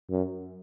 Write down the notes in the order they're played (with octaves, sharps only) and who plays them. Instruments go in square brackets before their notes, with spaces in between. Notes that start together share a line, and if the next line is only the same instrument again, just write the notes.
[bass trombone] F#2